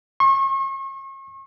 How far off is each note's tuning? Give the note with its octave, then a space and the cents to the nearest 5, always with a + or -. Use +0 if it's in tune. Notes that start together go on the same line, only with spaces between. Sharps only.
C#6 -40